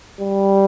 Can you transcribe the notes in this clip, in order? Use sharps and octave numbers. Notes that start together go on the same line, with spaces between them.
G3